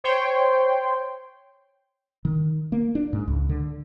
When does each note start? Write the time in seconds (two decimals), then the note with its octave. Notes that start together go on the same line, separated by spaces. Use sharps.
0.04 C5 C#5 G5 C6
2.25 D#3
2.72 A#3
2.95 D4
3.13 G#2
3.27 C#2
3.49 D3